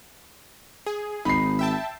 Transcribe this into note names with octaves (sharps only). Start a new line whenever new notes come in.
G#4
G#1 D#4 B5 C7
E5 G5 A5